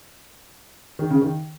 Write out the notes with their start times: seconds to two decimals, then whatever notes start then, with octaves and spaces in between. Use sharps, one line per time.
0.99 D#3
1.10 C#3
1.22 D#3